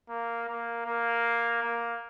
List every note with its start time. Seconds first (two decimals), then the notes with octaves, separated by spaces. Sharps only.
0.09 A#3
0.48 A#3
0.86 A#3
1.63 A#3